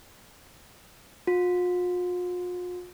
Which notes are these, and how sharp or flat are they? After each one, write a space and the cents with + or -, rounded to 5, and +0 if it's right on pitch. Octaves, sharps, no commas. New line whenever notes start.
F4 +45